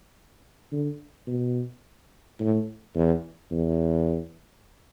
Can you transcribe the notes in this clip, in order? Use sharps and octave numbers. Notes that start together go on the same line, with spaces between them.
D3
B2
A2
E2
E2